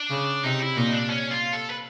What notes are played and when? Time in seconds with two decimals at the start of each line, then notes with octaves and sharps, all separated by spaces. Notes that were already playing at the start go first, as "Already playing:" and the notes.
Already playing: D4
0.10 C#3
0.44 C3 D#4
0.60 E4
0.77 A#2 D#4
0.93 D4
1.10 C#4
1.31 F4
1.53 A4
1.70 B4